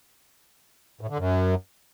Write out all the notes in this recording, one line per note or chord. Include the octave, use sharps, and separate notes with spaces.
A2
D3
F#2